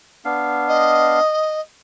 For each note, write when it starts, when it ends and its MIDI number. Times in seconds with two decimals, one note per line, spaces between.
0.25 1.20 59
0.25 1.20 62
0.25 1.20 77
0.68 1.60 75